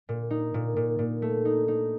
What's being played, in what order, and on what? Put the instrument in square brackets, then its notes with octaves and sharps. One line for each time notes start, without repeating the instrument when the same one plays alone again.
[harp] A#2
D#4
A#2
A#2
A#2
A3
D#4
D#4